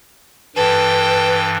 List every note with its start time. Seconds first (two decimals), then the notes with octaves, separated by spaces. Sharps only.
0.56 G2 E3 A4 B4 G5